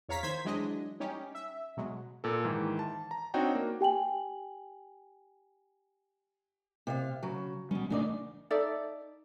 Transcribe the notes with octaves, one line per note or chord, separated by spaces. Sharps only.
E2 C#5 F5 A#5 B6
D#3 C5 G#6 B6
E3 F#3 G#3 D4 D#5
G3 C#4 D#4 G4
E5
B2 F#3 G#3
A#2 A4
G#2 D#3 E3
A5
A#5
C4 D4 D#4 F#4 C#5 G5
A#3
G4 G5 G#5 F#7
C3 D#5 F5
C#3 F#3
B2 G3 C#4
A1 C#3 A3 D4 D#4 D5
D#4 A4 D5 E5